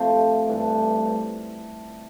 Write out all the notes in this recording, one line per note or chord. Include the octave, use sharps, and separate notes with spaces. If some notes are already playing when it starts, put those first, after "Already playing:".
Already playing: C3 F3 A3 C4 C5 D5
G4
G2 E3 A3 D4